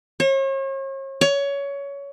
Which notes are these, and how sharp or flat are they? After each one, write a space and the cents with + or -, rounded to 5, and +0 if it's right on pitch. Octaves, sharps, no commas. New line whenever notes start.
C#5 -40
C#5 +20